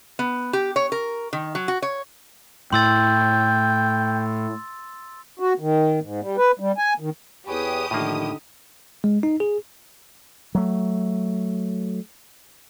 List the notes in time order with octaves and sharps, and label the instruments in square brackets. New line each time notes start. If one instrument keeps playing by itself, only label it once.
[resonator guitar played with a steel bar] B3
G4
C#5
A#4
D#3
F#3
F#4
C#5
[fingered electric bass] A2 [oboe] G5 [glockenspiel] C6 E6 A6
[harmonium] F#4
D#3
G#2
G3
B4
G3
G#5
D#3
[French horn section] E2 [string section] G4 D#6 [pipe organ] G#4 B4 C#5
[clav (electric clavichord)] A2 A#3 [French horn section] D3 D#4 [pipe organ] D#3 F3
[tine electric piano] G#3
D#4
G#4
[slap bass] F#3 A3